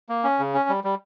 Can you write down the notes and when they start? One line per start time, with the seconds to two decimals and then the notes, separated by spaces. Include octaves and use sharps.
0.09 A#3
0.24 C#4
0.39 C#3
0.54 C#4
0.69 G3
0.84 G3